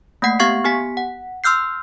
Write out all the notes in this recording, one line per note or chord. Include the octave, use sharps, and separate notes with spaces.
A3 A#3 F#5 C7
B3 G4 F5 C#6 G#6 C7
B3 G4 G#5 B6
F#5
C6 E6 F6 G6 C7